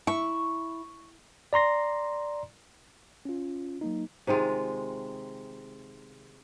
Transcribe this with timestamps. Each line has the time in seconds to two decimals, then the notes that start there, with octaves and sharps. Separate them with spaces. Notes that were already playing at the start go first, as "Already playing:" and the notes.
0.07 E4 C#6
1.53 D5 A#5 C6 A#6
3.25 C#4 F4
3.81 F#3 A#3 D#4
4.27 C3 D#3 G#3 F4